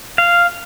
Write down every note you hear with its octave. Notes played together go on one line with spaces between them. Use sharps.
F5